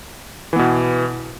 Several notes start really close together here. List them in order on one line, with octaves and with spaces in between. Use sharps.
E3 B3 B2